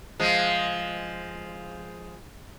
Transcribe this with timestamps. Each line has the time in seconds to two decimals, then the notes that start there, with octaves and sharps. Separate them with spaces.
0.20 F3 G#3